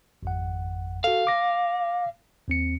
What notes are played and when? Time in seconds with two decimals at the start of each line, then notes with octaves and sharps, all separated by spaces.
0.23 G#1 F2 F#5
1.04 F#4 A4 F5
1.27 D6 A#6
2.48 D#2 C4 C#7